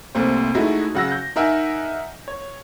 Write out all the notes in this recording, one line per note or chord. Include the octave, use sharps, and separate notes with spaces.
C2 A3 A#3 C5
G#3 A3 D#4 E4 F#4
C#3 F#3 F#5 E6 A#6
G6
D#4 A#4 E5 F#5 G#5
C#5